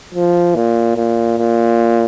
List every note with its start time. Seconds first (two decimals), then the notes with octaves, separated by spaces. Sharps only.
0.14 F3
0.55 A#2
0.97 A#2
1.38 A#2